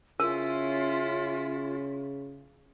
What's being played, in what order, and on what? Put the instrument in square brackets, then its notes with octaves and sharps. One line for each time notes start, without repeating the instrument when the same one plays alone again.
[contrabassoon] C#3 [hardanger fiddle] C#4 E4 [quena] F4 [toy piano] A#4